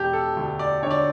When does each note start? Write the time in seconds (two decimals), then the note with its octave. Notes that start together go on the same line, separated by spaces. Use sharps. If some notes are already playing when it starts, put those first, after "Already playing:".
Already playing: E1 G4
0.13 A4
0.37 D2
0.59 D5
0.83 D3 C#5
0.91 D5